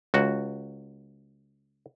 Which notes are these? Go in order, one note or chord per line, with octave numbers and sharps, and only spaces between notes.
C#2 F#4